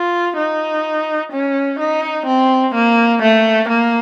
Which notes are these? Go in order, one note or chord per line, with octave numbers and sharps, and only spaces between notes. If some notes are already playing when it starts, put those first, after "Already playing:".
Already playing: F4
D#4
C#4
D#4
C4
A#3
A3
A#3